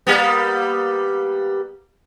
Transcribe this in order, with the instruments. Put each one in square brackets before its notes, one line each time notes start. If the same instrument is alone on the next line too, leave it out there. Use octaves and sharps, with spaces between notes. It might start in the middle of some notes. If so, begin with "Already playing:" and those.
[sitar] G3 A#3 B3